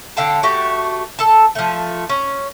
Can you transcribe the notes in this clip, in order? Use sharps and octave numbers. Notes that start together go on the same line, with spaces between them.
D3 F5 G5 A5
A3 F#4 G4
A4 A5
F3 A3
C#4